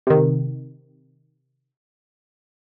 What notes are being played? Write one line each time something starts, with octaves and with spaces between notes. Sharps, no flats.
C3 D#3